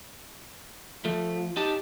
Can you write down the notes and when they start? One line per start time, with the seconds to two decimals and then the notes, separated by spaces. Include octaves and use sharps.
1.05 F3 A3
1.57 D#4 G4 A5